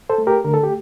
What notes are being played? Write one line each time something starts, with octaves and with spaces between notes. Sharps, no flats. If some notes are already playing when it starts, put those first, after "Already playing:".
A4 C5
A3
G4 A#4
D3 A#4
A4
G4